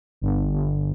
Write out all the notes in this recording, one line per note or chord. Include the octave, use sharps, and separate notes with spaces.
G1
G1